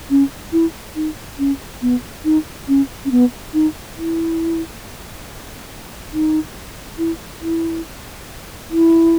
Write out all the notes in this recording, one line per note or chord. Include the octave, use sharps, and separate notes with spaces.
C#4
E4
D#4
C#4
B3
D#4
C#4
C#4
B3
D#4
E4
D#4
E4
E4
E4